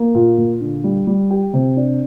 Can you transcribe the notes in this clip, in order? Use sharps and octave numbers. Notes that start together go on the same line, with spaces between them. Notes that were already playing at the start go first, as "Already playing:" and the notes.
Already playing: A#3
A#2
A#2
D3
G3
G3
G4
C3
D4